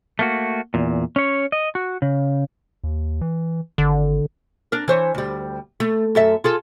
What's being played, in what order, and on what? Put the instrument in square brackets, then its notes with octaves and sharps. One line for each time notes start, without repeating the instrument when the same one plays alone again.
[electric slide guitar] A3 A#3 F#4
E2 A#2
C#4 C#5
D#5
F#4
C#3
[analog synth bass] D#2
E3
[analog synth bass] G#1 [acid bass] D3
[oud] D4 A#4
E3 C5 C#5
D2 G3
A3
F#2 A4 E5
F4 G#4 A4